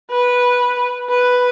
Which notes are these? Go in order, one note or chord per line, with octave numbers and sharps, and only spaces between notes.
B4
B4